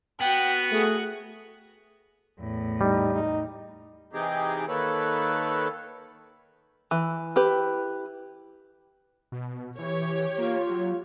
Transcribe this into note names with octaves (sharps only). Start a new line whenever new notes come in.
B3 F#4 G5 F#6
A3 G#4
E2 A2
G3 D#4
D#4
C3 E3 C4 D#4 G4 G#4
D#3 A#3 A4 B4 C#5
E3
E4 G4 B4
B2
E3 G4 C#5
A#3 F4
F#3